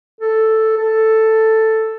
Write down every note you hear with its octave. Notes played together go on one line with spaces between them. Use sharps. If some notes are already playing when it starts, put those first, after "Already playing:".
A4
A4